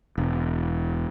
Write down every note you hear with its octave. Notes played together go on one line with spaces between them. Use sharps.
E1